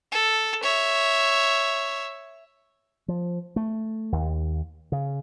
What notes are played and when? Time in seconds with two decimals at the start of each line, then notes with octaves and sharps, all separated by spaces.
0.12 A4
0.63 C#5 E5
3.08 F3
3.56 A3
4.12 D#2
4.92 C#3